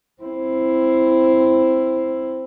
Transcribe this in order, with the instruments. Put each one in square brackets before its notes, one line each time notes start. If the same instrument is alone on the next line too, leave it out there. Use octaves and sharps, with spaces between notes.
[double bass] C4 E4